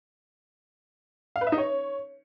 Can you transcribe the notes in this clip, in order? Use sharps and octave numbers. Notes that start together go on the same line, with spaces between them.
F5
B4
E5
D#4
C#5